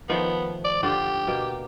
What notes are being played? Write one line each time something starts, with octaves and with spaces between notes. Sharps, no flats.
D#3 F3 A3 B3
D5
D3 F4 G4 D5
B2 A#3 G5